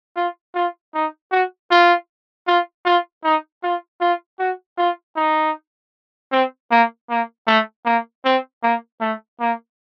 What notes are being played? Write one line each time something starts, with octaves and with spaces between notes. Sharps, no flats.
F4
F4
D#4
F#4
F4
F4
F4
D#4
F4
F4
F#4
F4
D#4
C4
A#3
A#3
A3
A#3
C4
A#3
A3
A#3